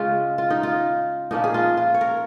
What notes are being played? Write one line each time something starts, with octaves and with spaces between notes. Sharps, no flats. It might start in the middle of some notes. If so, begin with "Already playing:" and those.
Already playing: C#3 G#3 C#4 F4
F4
D#4
F4
A#2 F3 A#3 C#4 D#4
G#4
F4
F4
C#5
A#4